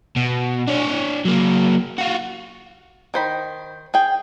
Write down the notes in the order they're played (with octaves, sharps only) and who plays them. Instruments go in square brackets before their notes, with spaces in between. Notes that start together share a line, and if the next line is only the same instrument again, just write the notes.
[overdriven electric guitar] B2
D4 C#5
F#3 A#3
F4 F#4
[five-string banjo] D#3 C5 B5
G#4 G5